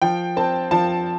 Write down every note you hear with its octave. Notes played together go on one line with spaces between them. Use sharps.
F3 G5
C4 A5
F3 A5